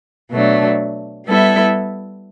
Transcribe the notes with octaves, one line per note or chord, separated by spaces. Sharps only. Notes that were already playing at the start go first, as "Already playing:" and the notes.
B2 F#3 A3 D4
G3 B3 E4 A4 E5